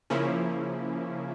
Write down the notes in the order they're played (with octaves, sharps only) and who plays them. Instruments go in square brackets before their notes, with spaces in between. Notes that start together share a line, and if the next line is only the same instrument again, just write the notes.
[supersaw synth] C#3 F3 A#3 C#4 E4